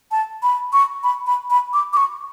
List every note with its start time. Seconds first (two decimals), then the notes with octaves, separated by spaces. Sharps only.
0.11 A5
0.43 B5
0.73 C#6
1.04 B5
1.27 B5
1.50 B5
1.73 D6
1.93 D6
1.97 C#6